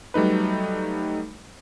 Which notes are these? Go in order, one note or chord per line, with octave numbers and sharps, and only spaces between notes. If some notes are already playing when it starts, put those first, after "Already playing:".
F#3 G3 A3 D#4 B4